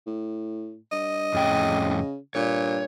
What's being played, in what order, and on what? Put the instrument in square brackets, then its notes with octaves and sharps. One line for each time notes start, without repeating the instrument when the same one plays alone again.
[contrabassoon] A2
[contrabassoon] G2 [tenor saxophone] D#5
[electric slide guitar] F2 A2 G5 [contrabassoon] C#3
[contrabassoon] G2 [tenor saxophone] A#2 [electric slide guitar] C#5